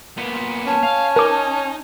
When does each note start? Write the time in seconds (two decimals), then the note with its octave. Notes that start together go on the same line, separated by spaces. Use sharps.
0.17 A#2 B3
0.67 C#4 A5
0.83 F5
1.16 D#4 A#4 D6